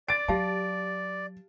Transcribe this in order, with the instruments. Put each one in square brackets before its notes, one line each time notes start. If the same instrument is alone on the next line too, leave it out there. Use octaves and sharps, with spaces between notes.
[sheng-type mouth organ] D5 [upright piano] A6 D7
[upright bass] F#3 [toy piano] G4 F5 A5